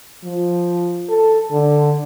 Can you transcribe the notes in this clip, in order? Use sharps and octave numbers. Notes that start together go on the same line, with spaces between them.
F3
A4
D3